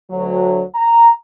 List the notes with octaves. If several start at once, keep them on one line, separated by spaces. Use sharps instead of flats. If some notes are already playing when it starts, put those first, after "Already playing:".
D2 F#3
A#5